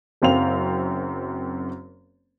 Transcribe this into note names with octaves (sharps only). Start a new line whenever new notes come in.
F#1 F#2 C4 F5 F7